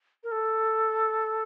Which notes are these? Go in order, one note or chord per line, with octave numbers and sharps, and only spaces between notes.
A#4
A4